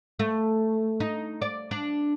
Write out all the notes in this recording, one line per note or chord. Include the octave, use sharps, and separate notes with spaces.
A3
D#4
D5
D4